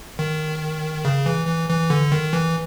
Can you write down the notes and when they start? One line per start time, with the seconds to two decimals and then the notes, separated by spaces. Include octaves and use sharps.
0.19 D#3
1.05 C#3
1.26 E3
1.47 E3
1.69 E3
1.90 D3
2.12 D#3
2.33 E3